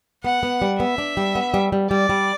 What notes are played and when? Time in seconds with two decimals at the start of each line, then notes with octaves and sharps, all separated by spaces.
0.24 B3 F#5
0.43 B3
0.62 G3
0.80 B3 E5
0.98 D4
1.17 G3
1.35 B3
1.54 G3
1.72 G3
1.91 G3 D5
2.09 G3